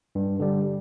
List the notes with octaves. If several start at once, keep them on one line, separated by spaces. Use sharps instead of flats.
G2
D3 G3